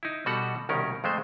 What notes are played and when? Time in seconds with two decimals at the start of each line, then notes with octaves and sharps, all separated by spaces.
0.03 D#4 E4
0.26 B2 G3 F#4 A4 F#5
0.69 C2 B2 D#3 C#4 A#4
1.04 F2 G#3 A3 C5